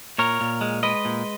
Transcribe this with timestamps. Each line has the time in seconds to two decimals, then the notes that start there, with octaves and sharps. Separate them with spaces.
0.18 A#2 A#4 C#5
0.41 A#2
0.61 G#3
0.83 G#3 B4 D#5
1.05 A#2